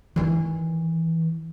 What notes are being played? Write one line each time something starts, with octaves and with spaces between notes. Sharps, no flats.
D#3 E3